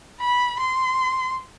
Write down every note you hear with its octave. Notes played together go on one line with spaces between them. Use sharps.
B5
C6